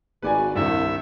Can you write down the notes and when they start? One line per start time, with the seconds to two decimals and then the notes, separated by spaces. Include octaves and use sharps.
0.22 G#1 G#3 F#4 B4 D5 G#5
0.55 C2 G2 D#3 G4 E5